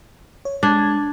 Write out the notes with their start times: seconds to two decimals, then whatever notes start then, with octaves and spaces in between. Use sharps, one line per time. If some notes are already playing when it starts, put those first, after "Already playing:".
0.45 C#5
0.63 G#3 D4 G#6